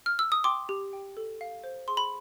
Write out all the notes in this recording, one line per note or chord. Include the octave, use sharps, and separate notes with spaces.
F6
E6
D#6
G5 C6 D6
G4
G5
A4
F5
C5
G#4 C6
B5